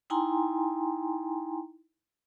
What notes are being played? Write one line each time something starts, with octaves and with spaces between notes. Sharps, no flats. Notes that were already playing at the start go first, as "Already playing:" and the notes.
D#4 E4 G5 G#5 A#5 C6